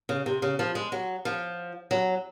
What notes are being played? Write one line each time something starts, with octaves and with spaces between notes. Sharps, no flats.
C#3
C3
C#3
F3
G#3
F#3
F3
F#3